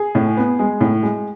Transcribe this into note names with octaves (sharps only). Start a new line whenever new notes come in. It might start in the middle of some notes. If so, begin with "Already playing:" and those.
Already playing: G#4
A2
B3
G#3
A2
G#3